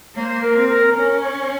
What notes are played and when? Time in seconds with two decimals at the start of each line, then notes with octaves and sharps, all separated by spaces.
0.15 A#3 C#5
0.20 C5
0.42 A#4
0.55 C4
0.68 A#4
0.94 C#4 A#4
1.20 C#5